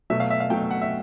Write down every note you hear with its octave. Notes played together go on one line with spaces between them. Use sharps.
B2 F#3 A3 E5
F5
E5
F5
B2 F#3 A3 G5
F#5
E5